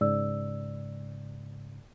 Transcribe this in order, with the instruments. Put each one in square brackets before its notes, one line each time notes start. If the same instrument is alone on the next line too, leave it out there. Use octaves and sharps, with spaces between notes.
[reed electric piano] G#2 C#3 [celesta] D5 E6